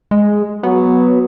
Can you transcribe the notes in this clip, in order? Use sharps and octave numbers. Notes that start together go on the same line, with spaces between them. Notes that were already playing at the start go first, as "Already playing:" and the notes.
G#3
F#3 B3